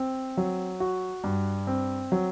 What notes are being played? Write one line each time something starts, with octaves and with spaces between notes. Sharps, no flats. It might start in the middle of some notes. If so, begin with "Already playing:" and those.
Already playing: C4
F#3
F#4
G2
C4
F#3